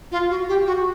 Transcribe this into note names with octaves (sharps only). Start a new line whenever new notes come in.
F4
F#4
G4
F#4